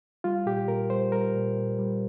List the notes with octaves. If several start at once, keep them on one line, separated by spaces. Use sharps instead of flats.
G3 F4
A#2 G4
A#2 A#4
G3 C5
G3 A#4
A#2
A#2
G3